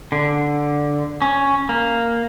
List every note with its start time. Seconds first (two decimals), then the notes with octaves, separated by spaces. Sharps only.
0.12 D3
1.22 C#4
1.69 A#3